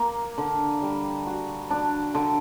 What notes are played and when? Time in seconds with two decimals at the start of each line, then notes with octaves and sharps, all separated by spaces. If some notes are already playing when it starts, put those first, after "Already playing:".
Already playing: A#3
0.38 D3
0.82 G3
1.27 F#4
1.71 D4
2.15 D3